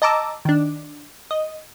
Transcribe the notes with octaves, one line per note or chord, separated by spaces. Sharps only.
D#5 A5 A#5 D6 E6
D#3 D4
D#5